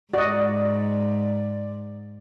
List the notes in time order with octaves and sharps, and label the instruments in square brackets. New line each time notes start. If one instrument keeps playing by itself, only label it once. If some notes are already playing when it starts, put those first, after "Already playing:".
[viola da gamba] G#2 [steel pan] F#4 D#5 [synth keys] D5